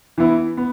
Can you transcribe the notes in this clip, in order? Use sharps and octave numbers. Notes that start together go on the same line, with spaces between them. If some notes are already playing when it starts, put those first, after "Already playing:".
E3 B3 E4
B3